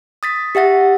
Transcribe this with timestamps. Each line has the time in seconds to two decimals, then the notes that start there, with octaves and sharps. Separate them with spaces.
0.23 D#6 A6 B6
0.55 G4 E5 F#5 A6